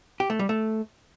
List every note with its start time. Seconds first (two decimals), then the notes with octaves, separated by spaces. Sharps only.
0.20 G4
0.30 A3
0.39 G3
0.49 A3